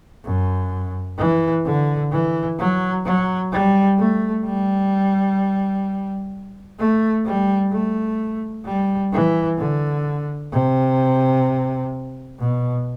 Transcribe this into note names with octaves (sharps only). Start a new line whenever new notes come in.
F#2
E3
D3
E3
F#3
F#3
G3
A3
G3
A3
G3
A3
G3
E3
D3
C3
B2